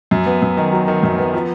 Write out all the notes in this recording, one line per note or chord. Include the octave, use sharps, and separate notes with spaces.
F#2
B3
F#2
D#3
F#3
D#3
F#2
B3
F3